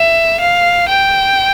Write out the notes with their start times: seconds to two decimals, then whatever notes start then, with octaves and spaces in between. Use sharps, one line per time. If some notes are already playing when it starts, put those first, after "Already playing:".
Already playing: E5
0.40 F5
0.89 G5